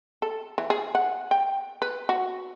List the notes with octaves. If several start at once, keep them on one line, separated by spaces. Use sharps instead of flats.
A4
E3
G#4
F#5
G5
B4
F#4